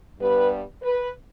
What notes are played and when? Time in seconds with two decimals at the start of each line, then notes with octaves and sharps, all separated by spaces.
0.20 G2 G3 B3 B4
0.83 B4